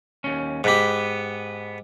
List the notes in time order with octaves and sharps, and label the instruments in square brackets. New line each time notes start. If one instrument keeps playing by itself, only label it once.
[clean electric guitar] D#2 C#4
[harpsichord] G#2 G4 [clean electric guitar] B3 F#5 B5